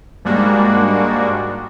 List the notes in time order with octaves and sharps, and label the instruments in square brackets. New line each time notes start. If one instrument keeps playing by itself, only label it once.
[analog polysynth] G#2 G3 G#3 A#3 D4 F#4